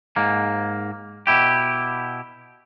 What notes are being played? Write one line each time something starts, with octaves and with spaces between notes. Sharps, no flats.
G#2 A#3
B2 E4 G4